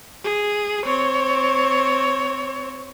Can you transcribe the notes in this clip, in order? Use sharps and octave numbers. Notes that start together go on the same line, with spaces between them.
G#4
C4 C#5